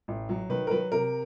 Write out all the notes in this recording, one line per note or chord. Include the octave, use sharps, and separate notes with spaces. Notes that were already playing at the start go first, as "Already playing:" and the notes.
A1
F#3
D#3 B4
A#4
F#3 B4
C3 A#4